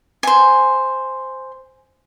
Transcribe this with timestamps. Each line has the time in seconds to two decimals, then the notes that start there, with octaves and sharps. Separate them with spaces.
0.23 C5 G#5